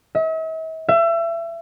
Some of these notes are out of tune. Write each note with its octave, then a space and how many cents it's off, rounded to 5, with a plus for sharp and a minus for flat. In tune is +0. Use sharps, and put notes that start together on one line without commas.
E5 -45
E5 +30